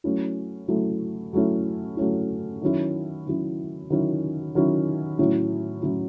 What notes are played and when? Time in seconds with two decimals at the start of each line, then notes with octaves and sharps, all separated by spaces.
0.04 F#3 A3 C#4 E4
0.68 F#3 A3 C#4 E4
1.33 F#3 A3 C#4 E4
1.97 F#3 A3 C#4 E4
2.62 D#3 F#3 C#4 E4
3.27 D#3 F#3 C#4 E4
3.90 D#3 F#3 C#4 E4
4.55 D#3 F#3 C#4 E4
5.19 A2 F#3 C#4 E4
5.83 A2 F#3 C#4 E4